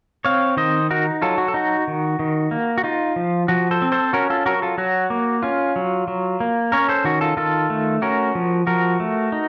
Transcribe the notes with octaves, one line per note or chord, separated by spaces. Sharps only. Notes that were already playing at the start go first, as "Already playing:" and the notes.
C4 C#5 F5
D#3 C5 D#5
D#4 F#4 A#4
F#3 F4 A4
F#4
A4
D#4 F#4
D#3
D#3
A#3
F#4
D#4 F4
F3
F3 F#4
A4 C5
C4
A4 C5
C#4 F#4 A#4
F4 A4
F#3 F#4 A#4
F4 A4
F#3 F#4
A#3
C#4 F4
F#3
F#3
A#3
C#4 A#4 C#5
A4 C5
D#3 F#4
F4 A4
D#3 F4 A4
A3
C#4 F#4 A#4
F3
F3 F#4 A#4
A3
D#4